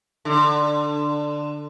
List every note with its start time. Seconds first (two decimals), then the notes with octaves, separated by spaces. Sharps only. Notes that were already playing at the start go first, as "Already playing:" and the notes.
0.25 D3